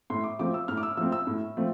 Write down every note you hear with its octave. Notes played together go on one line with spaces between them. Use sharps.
A2 C6
D6
F3 A3 C4 D6
E6
A2 F6
D6
E6
F3 A3 C4 E6
E6
A2
F3 A3 C4